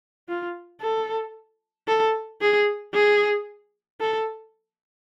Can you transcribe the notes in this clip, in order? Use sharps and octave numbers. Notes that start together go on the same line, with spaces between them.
F4
A4
A4
G#4
G#4
A4